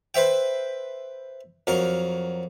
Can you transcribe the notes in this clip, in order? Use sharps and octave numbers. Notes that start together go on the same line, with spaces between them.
B4 C5 E5 G5
F2 F#3 A#4